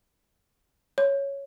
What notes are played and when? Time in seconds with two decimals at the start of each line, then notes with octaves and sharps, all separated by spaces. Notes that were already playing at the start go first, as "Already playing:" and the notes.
0.98 C#5